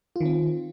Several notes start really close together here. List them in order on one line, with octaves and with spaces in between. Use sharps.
F4 D#3 C4